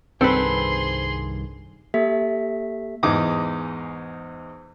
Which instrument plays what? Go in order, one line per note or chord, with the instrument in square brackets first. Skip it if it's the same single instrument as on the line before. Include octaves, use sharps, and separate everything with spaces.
[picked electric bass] C2 G2 D#3 [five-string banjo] C4 [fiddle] G#4 C6 [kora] A4 B4
[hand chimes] A#3 G4 A4 E5 B6
[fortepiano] E2 G#2 D#4 D6 D#6